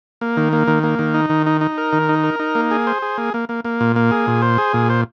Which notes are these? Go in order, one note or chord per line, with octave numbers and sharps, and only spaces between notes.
A#3
D#3
A#3
D#3
A#3
D#3
D#4
D#3
D#4
D#4
A#4
D#3
D#4
A#4
D#4
A#3
G#4
C5
G#4
A#3
A#3
A#3
A#3
A#2
A#3
G#4
A#2
C5
G#4
A#2
C5